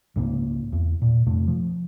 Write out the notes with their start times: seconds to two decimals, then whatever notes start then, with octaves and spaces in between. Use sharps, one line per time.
0.16 C#2 G#2 C#3 A#3
0.73 E2
1.02 A#2
1.26 F2 C3 A3
1.47 F3